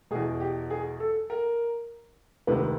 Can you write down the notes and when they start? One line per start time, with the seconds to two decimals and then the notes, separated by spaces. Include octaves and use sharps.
0.11 E2 B2 G#4
0.40 G4
0.70 G#4
1.00 A4
1.30 A#4
2.47 D2 C3 D#3 B4